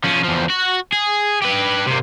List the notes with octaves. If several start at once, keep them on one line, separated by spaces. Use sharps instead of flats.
F3 C#4
E2 F3
F#4
G#4
G4 B4
C3 A#3